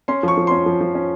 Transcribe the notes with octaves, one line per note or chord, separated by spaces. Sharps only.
C#4 C6
F3 C#6
F3
C#4 C6
F3
F3
C#4